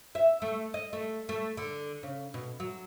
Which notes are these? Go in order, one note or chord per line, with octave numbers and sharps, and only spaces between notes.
E5
A3
D#5
A3
A3
D3
C#3
B2
F#3